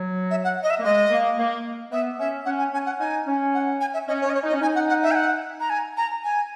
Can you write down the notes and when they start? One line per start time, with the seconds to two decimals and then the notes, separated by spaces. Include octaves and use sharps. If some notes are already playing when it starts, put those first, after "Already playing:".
Already playing: F#3
0.31 E5
0.44 F#5
0.63 D#5
0.70 E5
0.79 A#3
0.84 G#3 D#5
1.11 A#3
1.38 A#3
1.92 B3 E5
2.19 C#4 E5
2.45 C#4 F#5
2.59 G#5
2.73 C#4 G#5
2.86 F#5
3.00 D#4 G#5
3.27 C#4
3.54 F#5
3.81 G#5
3.94 E5
4.08 C#4 D#5
4.21 C#5
4.26 C#4 D#5
4.34 C#5
4.44 D#4 D#5
4.52 C#4
4.61 D#4 G#5
4.75 F#5
4.89 F#5
5.03 E5
5.11 G#5
5.15 F#5
5.60 A#5
5.70 G#5
5.97 A#5
6.24 G#5